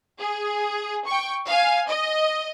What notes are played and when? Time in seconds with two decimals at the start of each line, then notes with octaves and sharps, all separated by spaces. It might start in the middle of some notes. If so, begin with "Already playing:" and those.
0.20 G#4
1.07 G5 C#6
1.47 F5 G#5
1.88 D#5